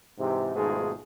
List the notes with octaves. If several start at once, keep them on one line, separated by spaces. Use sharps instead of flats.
G#2 C3 E3
G#1 G#2 B2 F3 A3 G#4